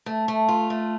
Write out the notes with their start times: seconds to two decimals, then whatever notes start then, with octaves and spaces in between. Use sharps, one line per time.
0.06 A3
0.28 A3
0.48 F4
0.70 A3